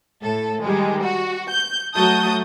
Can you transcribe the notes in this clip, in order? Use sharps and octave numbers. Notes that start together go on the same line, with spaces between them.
A2 A4
D#3 G3 G#3
F#4
G6
F#3 A3 F#4 A5 D#6 G6